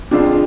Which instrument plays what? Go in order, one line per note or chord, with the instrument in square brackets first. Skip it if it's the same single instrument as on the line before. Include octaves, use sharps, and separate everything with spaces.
[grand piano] F2 D3 G#3 C4 D4 F4